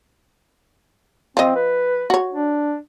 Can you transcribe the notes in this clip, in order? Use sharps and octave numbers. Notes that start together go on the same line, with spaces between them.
F3 C4 D#5
B4
F#4 C#5
D4